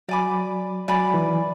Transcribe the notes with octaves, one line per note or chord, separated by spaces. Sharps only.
F#3 D5 G#5 B5 D6
F#3 D5 G#5 B5 D6
E3